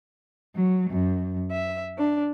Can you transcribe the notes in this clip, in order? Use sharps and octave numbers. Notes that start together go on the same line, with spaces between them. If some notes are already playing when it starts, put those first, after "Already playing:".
F#3
F#2
E5
D4